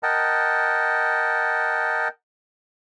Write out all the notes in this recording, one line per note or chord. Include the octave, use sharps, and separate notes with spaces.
A#4 D#5 F#5 G5 A5